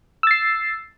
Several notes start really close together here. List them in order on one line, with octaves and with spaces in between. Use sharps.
E6 A6 C7